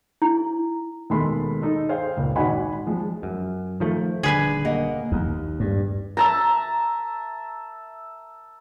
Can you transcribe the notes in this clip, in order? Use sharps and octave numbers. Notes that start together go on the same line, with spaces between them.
E4
D#2 B2 G#3 A4 B5 C6
D#4 A4 D#5
G#4 C5 F5 G5
C#2 A#2
G#1 F#4 D#5 F#5 G#5 B5
F3 G#3
F#2
D#3 F3 A3
D#1 D3 G#4 B4 G#5
A#3 D#5 F#5
D#2
G2
E5 A5 A#5